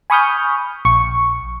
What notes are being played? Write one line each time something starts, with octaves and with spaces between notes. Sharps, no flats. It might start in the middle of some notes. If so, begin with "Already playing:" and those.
G#5 B5 C#6 D#6 F6 G6
A#1 C#6